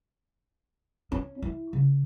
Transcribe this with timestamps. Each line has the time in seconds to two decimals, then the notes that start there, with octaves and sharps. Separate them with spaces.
1.12 C#4
1.42 E4
1.73 C#3